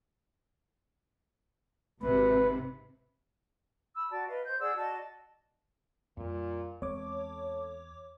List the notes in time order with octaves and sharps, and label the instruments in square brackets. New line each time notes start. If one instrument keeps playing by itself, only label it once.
[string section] G#1 C3 [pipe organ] B4
[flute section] B5 E6
F#4 D5 A5
B4 D#5 F5
C5 G6
G#4 D5 F#5 E6
F#4 D5 D#5 A5
[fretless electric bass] F2 G3 [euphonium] A#2
[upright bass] E2 [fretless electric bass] G#3 C4 [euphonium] A4 [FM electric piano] C#5 D6